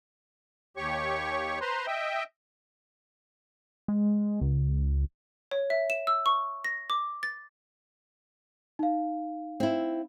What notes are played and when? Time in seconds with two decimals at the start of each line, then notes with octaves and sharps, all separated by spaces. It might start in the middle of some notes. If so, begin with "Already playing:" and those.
0.77 D#2 G4 C#5 C#6
1.61 B4 C5 A#5 C6
1.87 D#5 E5 G5
3.88 G#3
4.41 C#2
5.51 C#5
5.70 E5
5.90 E7
6.07 E6
6.26 C#6
6.65 A#6
6.90 D6
7.23 A6
8.79 D#4 F5
9.60 C4 E4